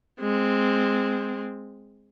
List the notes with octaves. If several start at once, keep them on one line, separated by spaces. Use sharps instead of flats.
G#3 C4